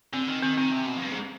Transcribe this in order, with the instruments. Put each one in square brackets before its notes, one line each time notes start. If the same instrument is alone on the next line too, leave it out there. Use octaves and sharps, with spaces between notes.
[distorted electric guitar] D3 [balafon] C4
[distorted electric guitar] D#3
[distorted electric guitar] D#3 [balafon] C4
[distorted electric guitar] D#3 [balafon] C4
[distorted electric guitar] C3
B2
F2
G2
G#2